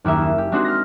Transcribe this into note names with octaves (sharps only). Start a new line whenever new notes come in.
F#1 D#2 A#3 E5
E7
G4
G#3 C4 D4 D#4 F#4
F6 A#6